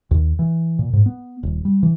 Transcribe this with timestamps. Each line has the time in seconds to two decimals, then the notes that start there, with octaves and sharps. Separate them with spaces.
0.11 D#2
0.39 E3
0.79 A#2
0.93 G#2
1.06 B3
1.43 D#1
1.65 G3
1.83 E3